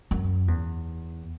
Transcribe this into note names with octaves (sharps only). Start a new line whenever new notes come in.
F#2
E2